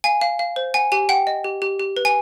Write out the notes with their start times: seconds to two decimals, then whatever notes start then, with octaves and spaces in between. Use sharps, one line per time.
0.04 F5 G#5
0.21 F5
0.39 F5
0.56 C5
0.74 F#5 G#5
0.92 G4 G#5
1.09 F#5 G5
1.27 D#5
1.44 G4
1.62 G4
1.80 G4
1.97 B4
2.05 G#5